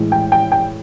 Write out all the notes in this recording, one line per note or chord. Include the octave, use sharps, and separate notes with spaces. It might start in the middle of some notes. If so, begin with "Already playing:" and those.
Already playing: A2 E3 G#3
G5
G5
G5